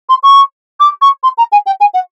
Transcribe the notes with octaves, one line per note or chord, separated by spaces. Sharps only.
C6
C#6
D6
C#6
C6
A#5
G#5
G5
G#5
F#5